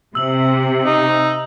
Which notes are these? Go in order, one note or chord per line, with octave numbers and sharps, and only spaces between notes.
C3 E6 F#7
D#4